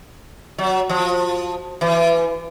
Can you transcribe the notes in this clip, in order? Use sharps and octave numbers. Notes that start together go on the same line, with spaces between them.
F#3
F3
E3